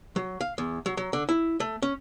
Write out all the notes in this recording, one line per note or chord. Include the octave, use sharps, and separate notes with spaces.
F#3
F5
E2
F#3
F#3
D3
E4
A3
C#4